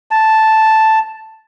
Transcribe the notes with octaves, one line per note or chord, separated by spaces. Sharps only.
A5